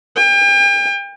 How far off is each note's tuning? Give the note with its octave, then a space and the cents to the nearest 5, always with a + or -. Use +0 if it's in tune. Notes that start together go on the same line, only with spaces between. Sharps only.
G5 +40